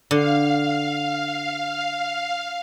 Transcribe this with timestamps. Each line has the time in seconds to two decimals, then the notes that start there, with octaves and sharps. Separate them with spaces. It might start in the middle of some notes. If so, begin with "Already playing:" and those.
0.11 D3 F5